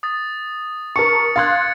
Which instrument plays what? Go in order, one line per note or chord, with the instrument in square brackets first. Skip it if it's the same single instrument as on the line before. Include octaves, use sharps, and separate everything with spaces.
[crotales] D#6 A6
[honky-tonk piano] A#4 A5 C#6 [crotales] C#7
[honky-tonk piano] F5 C6 F#6 [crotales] G#6 A6